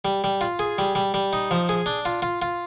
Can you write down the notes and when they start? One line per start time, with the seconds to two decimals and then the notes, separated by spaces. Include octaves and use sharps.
0.05 G3
0.24 G3
0.41 F4
0.59 G#4
0.78 G3
0.95 G3
1.14 G3
1.33 D#4
1.51 F3
1.69 G#4
1.86 D4
2.05 F4
2.22 F4
2.42 F4